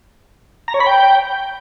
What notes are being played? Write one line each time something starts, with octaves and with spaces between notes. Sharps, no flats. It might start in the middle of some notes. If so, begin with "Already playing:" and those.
A#5
C#5
B5
G5